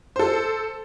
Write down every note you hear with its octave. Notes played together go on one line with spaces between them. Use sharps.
A4 C5